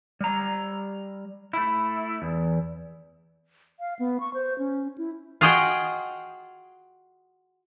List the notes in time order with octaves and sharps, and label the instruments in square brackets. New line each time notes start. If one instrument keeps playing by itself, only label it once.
[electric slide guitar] G3 A#5
A3 E4
E2
[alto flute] F5
B3
C#6
C5
C#4
E4
[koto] F4 F#4 G#4 D#5 F#5 G5